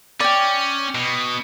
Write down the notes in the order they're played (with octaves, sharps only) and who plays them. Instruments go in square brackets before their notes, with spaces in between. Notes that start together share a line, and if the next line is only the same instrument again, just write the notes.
[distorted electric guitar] C#4 [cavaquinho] D5 G5
[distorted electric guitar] B2